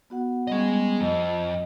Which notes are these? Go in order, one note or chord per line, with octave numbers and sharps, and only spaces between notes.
B3 F#4 F#5
G3 B3 C#4 G#4 D#5
F2 D#5